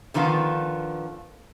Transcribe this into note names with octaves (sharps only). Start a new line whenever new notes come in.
D3 D#3 F3 B3 F5